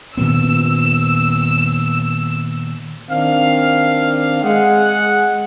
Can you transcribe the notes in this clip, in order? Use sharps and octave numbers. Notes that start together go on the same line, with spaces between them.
A#2 D#3 B3 E6
D#3 C4 D4 F5
G#3 G#4 F#5